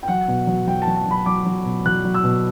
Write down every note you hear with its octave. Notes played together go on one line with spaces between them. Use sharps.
G5
F#3 F#5
B2
F#3
F#3 G5
A5
F#3
A5
F#3 B5
F#3 D6
F#3
B2
F#3 F#6
F#3
E6
B2